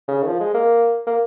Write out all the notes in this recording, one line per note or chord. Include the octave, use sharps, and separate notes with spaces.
C#3
D#3
F3
G#3
A#3
A#3